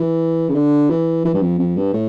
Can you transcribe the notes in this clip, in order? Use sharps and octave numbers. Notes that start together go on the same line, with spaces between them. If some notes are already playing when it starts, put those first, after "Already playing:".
Already playing: E3
C#3
D3
E3
E3
G2
F2
F2
G2
A2